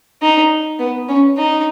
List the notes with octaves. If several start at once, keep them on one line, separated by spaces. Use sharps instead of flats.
D#4
B3
C#4
D#4